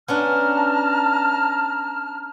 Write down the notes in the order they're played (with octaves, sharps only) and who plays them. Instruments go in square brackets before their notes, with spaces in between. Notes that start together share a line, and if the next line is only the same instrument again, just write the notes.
[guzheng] B3 C#4 D4 [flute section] A5 A#5 F6